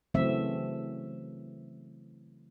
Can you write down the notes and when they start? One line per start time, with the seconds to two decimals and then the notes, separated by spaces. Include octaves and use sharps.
0.14 C#3 E3 F#3 A3 C4 E5